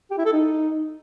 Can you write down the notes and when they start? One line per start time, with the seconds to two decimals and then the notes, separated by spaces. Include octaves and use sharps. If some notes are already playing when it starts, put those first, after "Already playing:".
0.11 G4
0.18 E4
0.26 A4
0.33 D#4